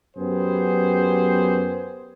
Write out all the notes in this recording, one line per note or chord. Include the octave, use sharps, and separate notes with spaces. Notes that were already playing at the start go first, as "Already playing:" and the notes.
F#2 B3 G4 G#4 C5